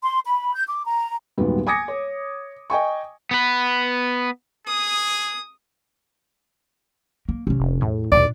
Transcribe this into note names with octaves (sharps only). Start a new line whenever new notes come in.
C6
B5
G6
D6
A#5
D#1 G#2 F#3 G3 B3
G#5 D6 D#6 G#6 A#6 C#7
C#5
D#5 G5 G#5 C#6
B3 B4
G#4 D#6
A#3
C3 C#4
F1
E2 A2
D#2 A#2 D4 D5